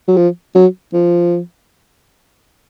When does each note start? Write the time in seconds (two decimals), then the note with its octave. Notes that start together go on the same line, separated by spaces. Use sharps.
0.08 F#3
0.17 F3
0.55 F#3
0.93 F3